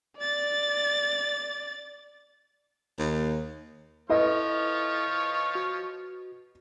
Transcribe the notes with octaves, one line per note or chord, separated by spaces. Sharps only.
D5 A6
D#2
F3 E4 A4 B4 C#5 D#5 F5
F#4